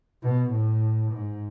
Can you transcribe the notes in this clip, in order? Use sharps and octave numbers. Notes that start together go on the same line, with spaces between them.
B2
A2
G#2